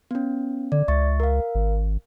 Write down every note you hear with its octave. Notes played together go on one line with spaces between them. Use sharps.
B3 C#4
D3 D5
C#2 E5 C#6 A6
A#4 F5
G#1